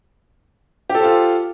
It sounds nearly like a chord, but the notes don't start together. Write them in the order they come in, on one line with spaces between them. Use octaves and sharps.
G4 A4 C5 F4